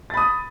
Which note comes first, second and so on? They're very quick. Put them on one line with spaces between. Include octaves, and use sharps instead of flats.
A6 B5 D#6